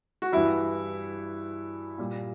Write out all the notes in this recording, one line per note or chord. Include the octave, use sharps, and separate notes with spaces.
F#4
G2 E3 G3 E4
A#2 G3